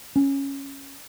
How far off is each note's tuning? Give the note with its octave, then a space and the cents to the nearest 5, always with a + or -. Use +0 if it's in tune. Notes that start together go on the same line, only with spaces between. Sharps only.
C#4 -5